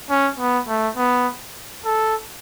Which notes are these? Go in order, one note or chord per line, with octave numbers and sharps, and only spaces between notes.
C#4
B3
A3
B3
A4